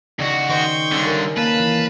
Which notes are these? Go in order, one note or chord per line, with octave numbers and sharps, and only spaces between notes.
D#2 C#3 F#4 D5 D#5
D#3 C5 D#5 G5 C6 C#6
G2 D3 C#4
A#4
A#3 B4 F5 A5
E3